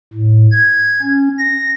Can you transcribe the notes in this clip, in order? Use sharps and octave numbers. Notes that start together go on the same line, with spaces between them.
A2
G#6
C#4
A#6